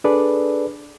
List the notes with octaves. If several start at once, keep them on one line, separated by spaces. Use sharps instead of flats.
D4 G#4 A4 B4 D5